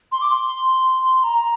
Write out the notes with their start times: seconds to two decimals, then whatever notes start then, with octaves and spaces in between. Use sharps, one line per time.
0.12 C6
0.21 D6
0.30 C6
1.24 A#5